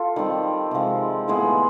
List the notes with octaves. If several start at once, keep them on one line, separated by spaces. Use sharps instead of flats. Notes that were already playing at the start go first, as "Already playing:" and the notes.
Already playing: F4 A4
D#3 G3 C4
C3 F3 G#3
A2 E3 G#3 B3